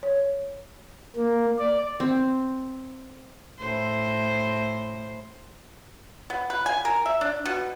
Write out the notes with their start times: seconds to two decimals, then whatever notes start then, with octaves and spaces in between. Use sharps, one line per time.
0.03 C#5
1.16 A#3
1.59 D5
2.00 C4
3.59 A2 C5
6.30 B3
6.50 B4
6.66 G#5
6.85 A#4
7.06 E5
7.21 D4
7.46 B2